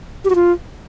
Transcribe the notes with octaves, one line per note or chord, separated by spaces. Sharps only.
G4
F#4
F4